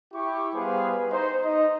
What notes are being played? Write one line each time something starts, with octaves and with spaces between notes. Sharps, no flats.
E4 G4 C#6
G3 B3 G#4 B4 C5 F5
D#4 C5
D#4 D#5